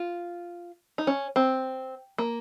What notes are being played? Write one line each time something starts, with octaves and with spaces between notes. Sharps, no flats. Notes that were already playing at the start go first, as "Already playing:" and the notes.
Already playing: F4
D#4
C#4
C4
A#3